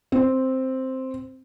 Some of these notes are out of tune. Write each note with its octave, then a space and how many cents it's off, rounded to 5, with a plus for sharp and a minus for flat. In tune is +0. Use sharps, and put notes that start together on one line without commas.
C4 +0